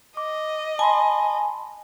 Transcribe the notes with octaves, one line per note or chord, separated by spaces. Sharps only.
D#5 D6
G#5 A5 B5 C6